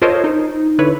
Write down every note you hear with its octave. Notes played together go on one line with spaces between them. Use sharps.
F4 A4 A#4 C5 C#5 D#5
D#4
D3 E4 B4 C#5